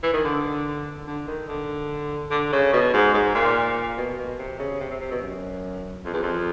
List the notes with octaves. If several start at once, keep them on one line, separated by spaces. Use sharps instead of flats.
E3
D#3
D3
D3
D#3
D3
D3
C#3
B2
G#2
G#2
A#2
B2
B2
C3
C#3
C3
C3
C3
B2
F#2
F2
E2
F2